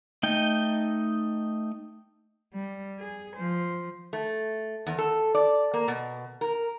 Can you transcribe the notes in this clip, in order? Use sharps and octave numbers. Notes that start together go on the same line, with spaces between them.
A3 D#4 D#5 G5
G3
G#4
F3 C5
A3
E2
A4
D5
A#3
B2
A#4